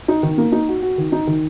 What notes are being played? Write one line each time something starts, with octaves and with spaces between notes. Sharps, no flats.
D#4
D#3
A#3
D#4
F#4
F#4
D#3
D#4
D#3